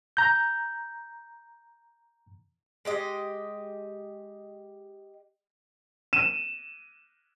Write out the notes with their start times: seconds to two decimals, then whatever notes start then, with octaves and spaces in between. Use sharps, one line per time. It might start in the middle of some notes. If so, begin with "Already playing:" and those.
0.17 A#5 G6
2.85 G#3 G4 D#5
6.13 D#7 E7